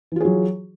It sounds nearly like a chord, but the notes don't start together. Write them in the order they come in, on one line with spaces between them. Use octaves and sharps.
E3 F4 G#4 F#3